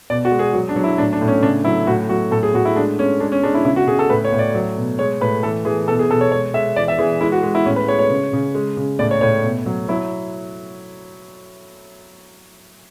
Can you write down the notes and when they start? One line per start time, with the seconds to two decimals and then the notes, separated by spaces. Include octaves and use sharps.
0.10 B2 D5
0.25 F#4
0.31 G#3
0.39 G#4
0.53 F#3 F#4
0.69 D4
0.76 F#3
0.84 E4
0.98 A2 D4
1.13 D4
1.21 A2
1.28 C#4
1.42 C#3 D4
1.64 F#3 E4
1.87 A2 F#4
2.09 F#3 F#4
2.31 A2 A4
2.43 G#4
2.54 A2 F#4
2.65 E4
2.76 G#3 D4
2.99 G#3 C#4
3.20 G#3 D4
3.32 C#4
3.43 G#3 D4
3.54 E4
3.65 C#3 E4
3.76 F#4
3.87 C#3 G#4
3.99 A4
4.10 A2 B4
4.25 C#5
4.33 A2
4.39 D5
4.55 F#3
4.77 B2
4.99 G#3 C#5
5.21 A2 B4
5.43 E3 A4
5.65 E3 G#4
5.87 B2 A4
5.99 G#4
6.10 B2 A4
6.21 C#5
6.32 G#3 C#5
6.54 G#3 E5
6.76 E3 D5
6.88 E5
6.99 E3 G#4
7.21 G#3 E4
7.32 F#4
7.43 G#3
7.55 E4
7.66 A2 C#4
7.76 B4
7.88 G#3 C#5
7.99 C#5
8.10 C#3
8.33 C#3
8.55 G#3
8.77 C#3
8.99 A2 D5
9.11 C#5
9.21 A2 C#5
9.43 B2
9.66 F#3
9.88 F#3 E4